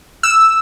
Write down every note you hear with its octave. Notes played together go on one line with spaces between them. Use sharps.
E6